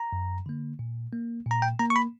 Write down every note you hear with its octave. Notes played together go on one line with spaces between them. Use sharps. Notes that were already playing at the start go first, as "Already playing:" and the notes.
Already playing: A#5
F#2
D3 A#3
A#2
A#3
A#2
A#5
G5
A#3 A#5
C#6
B5